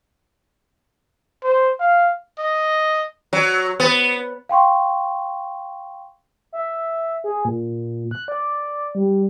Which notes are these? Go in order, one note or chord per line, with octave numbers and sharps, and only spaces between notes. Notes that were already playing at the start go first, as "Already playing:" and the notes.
C5
F5
D#5
F#3
B3
F5 G5 C6 C#6
E5
G#4
A#2
F#6
D5
G3